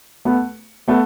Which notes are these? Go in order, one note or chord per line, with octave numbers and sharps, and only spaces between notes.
A3 B3
A3 B3